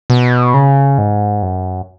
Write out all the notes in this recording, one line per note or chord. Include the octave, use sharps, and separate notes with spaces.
B2
C#3
G#2
F#2